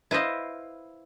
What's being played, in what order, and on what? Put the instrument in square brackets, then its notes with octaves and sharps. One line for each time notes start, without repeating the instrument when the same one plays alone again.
[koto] E4 B4 C5 D#5 F5